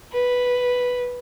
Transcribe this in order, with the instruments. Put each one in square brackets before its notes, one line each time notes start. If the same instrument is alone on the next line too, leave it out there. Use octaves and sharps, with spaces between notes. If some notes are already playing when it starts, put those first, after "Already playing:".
[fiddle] B4